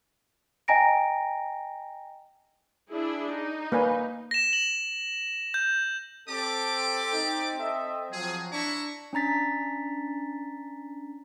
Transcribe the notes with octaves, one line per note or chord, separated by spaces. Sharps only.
D#5 G5 G#5 A#5 A#6 D7
D4 E4 G#4
D#4
A#3 B4 G#5
A#6 E7
F#7
G6
C4 G4 A4 D5 D6
D#4
A4 D#5 E5
F3 F#3 G#4
D4 E4 A#5 C#6
C#4 D4 A#5 A6 B6